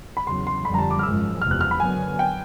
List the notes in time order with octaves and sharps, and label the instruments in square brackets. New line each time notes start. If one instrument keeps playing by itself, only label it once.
[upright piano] B5
[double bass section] E2 C#3 F#3 [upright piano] C6
[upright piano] C6
[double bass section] F2 D3 G3 [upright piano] B5
[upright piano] A#5
A5
D6
F6
[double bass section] G#1 F#2 C#3 F3 G#3 [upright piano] E6
[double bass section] F#1 E2 C3 F3 [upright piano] F6
[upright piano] F#6
F6
B5
[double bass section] F#2 D3 F#3 B3 [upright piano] G#5
[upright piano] G5